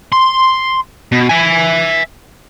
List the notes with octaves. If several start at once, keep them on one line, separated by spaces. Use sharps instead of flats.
C6
B2
E5 G#5